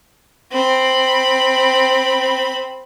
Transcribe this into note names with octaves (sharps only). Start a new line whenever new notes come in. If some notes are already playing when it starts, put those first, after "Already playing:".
C4 B5